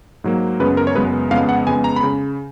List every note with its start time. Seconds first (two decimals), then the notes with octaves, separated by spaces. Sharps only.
0.24 G#2 F#3 A#3
0.60 F#2 C#3 G#3 B3 B4
0.77 A#4
0.87 C#5
0.95 F#2 C#3 G#3 B3 B4
1.31 F2 C#3 G#3 B3 F5
1.49 F#5
1.66 F2 C#3 G#3 B3 G#5
1.84 A#5
1.96 B5
2.03 C#3